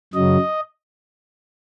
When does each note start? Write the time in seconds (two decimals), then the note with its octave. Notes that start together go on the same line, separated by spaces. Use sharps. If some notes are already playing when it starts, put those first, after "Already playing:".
0.13 F#2 C#3 F#3 D#5